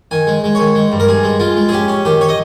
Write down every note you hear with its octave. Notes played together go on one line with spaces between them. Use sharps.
D#3 G#5
G#3
G#3
D#3 C#5
G#3
G2
A#4
G2 G#4
G#3
G#3 F4
G#3
G#4
C#4 G4
C#4
D#3 G4
C#5
D#5